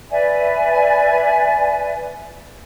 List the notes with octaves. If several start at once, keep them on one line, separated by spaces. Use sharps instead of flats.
B4 D5 E5 G#5